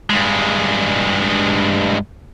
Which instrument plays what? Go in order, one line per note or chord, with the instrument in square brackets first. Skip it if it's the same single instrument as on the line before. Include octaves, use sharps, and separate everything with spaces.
[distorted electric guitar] G2 G#3